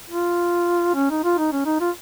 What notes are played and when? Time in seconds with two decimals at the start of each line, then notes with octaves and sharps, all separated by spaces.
0.10 F4
0.95 C#4
1.10 D#4
1.24 F4
1.38 D#4
1.52 C#4
1.66 D#4
1.81 F4